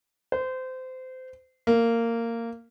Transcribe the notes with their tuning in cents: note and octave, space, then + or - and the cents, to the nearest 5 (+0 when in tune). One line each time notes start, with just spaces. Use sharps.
C5 -25
A#3 -15